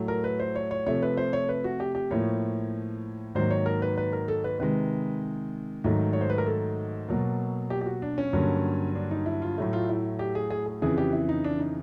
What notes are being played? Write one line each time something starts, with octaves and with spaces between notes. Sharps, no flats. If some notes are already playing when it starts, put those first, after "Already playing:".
Already playing: A2 F#3 A3
A#4
B4
C5
C#5
C#5
C3 F3 A3 C#5
B4
C5
C#5
B4
F#4
G4
G4
A2 F3 A#3 C#5
G#2 D#3 F#3 A#3 C5
C#5
A#4
B4
B4
A#4
A4
B4
C3 D#3 G#3 B4
G#2 D#3 F#3 A3
C#5
C5
B4
A#4
A4
B2 F#3 A#3
G4
G4
F#4
D4
C#4
G2 D3 F#3 A#3
D4
D#4
E4
F4
A2 F#3 A3
F4
E4
G4
G#4
G#4
G#4
F2 C#3 E3 G#4
G4
E4
D#4
D4
D#4